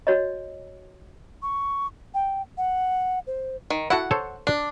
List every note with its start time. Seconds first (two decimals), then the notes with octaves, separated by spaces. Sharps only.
0.07 F#4 C#5 D#5
1.42 C#6
2.14 G5
2.58 F#5
3.27 C5
3.70 D#3
3.90 E4 F#4 A4 F#5
4.11 A4 C5 C#5
4.47 D4